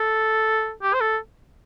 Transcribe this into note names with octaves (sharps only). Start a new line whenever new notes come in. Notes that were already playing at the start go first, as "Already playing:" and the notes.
Already playing: A4
G4
C5
A4